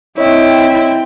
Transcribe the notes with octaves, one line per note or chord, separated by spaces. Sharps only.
C4 E4 C#5 D#5 G5